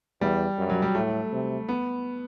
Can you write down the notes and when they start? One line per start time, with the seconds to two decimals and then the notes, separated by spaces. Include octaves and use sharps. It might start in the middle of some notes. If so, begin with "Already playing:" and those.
0.21 E2 G3
0.58 F#2
0.70 F#3
0.82 G3
0.95 A2 A3
1.32 C3
1.69 B3